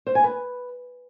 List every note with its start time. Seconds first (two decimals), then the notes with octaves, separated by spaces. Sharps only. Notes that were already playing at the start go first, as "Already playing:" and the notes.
0.07 C5
0.15 G#5
0.24 B4